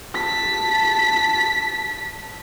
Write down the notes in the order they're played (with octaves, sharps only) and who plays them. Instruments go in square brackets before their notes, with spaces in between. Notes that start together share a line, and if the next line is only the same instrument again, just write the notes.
[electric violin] A5 B6